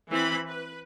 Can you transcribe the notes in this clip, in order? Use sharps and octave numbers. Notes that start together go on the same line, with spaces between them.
E3 C4 B5
B4